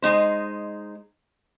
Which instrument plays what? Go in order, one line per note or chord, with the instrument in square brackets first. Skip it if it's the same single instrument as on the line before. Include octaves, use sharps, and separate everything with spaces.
[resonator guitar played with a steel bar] G#3 D#4 C5